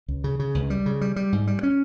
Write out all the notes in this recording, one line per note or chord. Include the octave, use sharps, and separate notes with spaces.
C#2
C#3
C#3
C#2
G3
C#3
G3
G3
G#2
G3
C#4